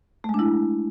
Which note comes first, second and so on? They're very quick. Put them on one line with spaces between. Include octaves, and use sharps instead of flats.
A3 G#3 D4 E4